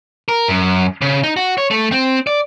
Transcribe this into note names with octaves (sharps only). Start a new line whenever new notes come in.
A#4
F#2
C#3
D#4
F#4
C#5
A3
C4
D5